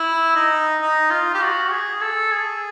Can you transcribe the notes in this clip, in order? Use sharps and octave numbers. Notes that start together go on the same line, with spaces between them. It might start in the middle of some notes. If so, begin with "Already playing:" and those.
Already playing: E4
D#4
D#4
F4
G4
F#4
G#4
A4
G#4